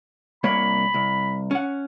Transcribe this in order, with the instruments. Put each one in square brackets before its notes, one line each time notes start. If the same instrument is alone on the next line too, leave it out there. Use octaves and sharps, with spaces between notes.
[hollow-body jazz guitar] C2 A#3 C#5 [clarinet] B5
[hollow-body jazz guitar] C2
C#4 F#5